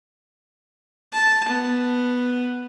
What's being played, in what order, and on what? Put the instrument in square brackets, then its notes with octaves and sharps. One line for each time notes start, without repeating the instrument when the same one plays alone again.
[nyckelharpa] A5
B3